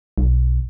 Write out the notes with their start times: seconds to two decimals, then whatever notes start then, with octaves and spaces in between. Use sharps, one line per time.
0.18 B1